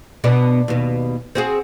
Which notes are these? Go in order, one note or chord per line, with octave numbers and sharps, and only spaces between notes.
B2 B3 D4
D#2 B2
C4 F#4 G#4